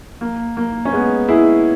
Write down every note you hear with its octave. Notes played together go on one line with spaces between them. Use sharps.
A#3
A#3
C#4
G#3 B3
E4 G#4